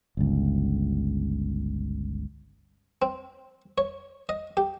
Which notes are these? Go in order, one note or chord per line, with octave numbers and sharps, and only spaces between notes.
G1 C#2
C4
C#5
D#5
G4